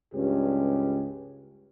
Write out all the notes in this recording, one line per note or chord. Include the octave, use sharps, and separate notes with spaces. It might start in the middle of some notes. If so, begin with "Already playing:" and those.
C#2 G2 C#4 G4